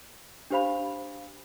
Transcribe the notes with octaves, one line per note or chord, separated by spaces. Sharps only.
D4 G4 C5 F5 B5 F7